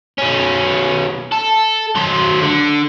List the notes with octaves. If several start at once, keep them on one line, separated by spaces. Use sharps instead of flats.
B2 C#4
A4
F#3 C5
D3